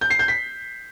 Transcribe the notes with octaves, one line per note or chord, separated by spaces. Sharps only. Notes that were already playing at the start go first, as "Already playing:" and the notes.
G6
C7
G6
B6